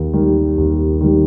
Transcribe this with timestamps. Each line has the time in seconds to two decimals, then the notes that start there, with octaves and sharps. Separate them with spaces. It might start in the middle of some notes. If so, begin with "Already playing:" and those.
Already playing: D#2
0.13 D#3 G3
0.58 D#2
1.01 D#3 G3